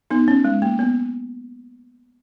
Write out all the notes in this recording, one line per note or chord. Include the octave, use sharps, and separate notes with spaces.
B3 D#4
C#4
G#3
A#3
B3